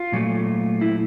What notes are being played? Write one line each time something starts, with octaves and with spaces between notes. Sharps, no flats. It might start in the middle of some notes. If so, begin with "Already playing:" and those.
Already playing: F4
A#2 F#3 A3
E4